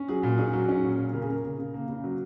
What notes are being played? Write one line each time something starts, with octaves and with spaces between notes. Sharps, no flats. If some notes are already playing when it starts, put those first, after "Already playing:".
Already playing: C#4
F#3 G#4
A#2
C#4 G#4
F#3
C#4
A#2
A#2
C#3 A#4
G#4
C#3 A#4
C#3
C#3
A#3
C#3
F#3